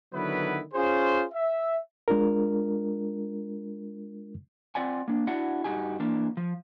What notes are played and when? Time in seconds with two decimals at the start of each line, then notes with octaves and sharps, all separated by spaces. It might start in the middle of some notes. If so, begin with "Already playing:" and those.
0.13 D3 D#3 F#3 B3 E4 B4
0.73 C#4 F4 G#4 C5
1.32 E5
2.08 G#3 D4 F4 A#4
4.75 C4 F4 D5 F#5 G#5
5.08 A#3 D4
5.27 D4 E4 F#4 F#5
5.64 G2 C3 D#4 F#4 G4 G#5
6.00 E3 A#3 D4
6.37 F3